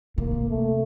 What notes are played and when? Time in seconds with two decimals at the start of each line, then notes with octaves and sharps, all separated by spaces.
0.18 C3 A#3
0.49 A3